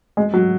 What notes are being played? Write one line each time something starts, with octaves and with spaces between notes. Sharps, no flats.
G#3
F#3